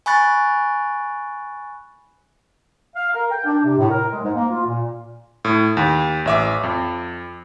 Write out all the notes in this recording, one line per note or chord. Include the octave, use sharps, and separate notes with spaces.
G#5 B5 C#6 F#6 A6
F5
A#4
G5
D4
C3
A2
A#4
G#3
G#2
A#3
F4
A#2
A2
D#2
A1 E5 D6
F2